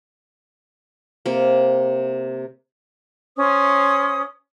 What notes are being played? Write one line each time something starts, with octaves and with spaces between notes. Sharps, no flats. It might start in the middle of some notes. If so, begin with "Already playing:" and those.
C3 A#3
C#4 C5 D#6